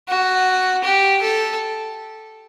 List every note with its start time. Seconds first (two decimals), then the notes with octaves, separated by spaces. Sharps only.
0.09 F#4
0.84 G4
1.21 A4